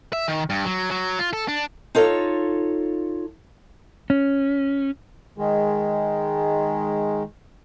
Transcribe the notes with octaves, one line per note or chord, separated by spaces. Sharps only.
E5
D#3
G2
F#3
F#3
F4
A4
D4
D#4 F4 A4 C#5
C#4
D#3 G#3